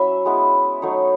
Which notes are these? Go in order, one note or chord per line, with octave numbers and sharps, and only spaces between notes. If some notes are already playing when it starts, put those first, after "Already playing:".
Already playing: F#3 C#4 E4 E5 B5
G#3 B3 E4
F#3 A3 D#4 C#5